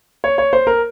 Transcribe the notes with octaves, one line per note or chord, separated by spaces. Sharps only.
C#5
C#5
C5
A#4